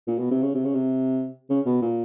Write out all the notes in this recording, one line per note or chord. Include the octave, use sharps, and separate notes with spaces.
A#2
B2
C3
C#3
C3
C#3
C3
C#3
B2
A#2